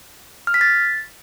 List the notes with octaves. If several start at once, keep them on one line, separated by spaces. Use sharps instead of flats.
F6
B6
A6